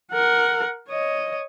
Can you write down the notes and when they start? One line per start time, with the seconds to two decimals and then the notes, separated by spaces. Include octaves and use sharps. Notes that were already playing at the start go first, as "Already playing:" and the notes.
0.12 A#4 F#5
0.88 C#5 D#5